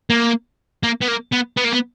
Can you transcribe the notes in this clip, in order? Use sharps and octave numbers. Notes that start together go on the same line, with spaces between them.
A#3
A#3
B3
A#3
B3
B3
A#3
B3